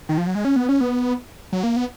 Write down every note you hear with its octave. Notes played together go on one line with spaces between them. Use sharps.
D#3
F3
F#3
G#3
C#4
B3
C#4
B3
F#3
A#3
B3